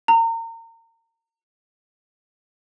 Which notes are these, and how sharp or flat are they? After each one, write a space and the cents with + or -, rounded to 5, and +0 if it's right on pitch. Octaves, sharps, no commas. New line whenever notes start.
A#5 -30